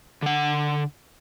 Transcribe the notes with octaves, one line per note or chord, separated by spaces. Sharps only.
D3 F#5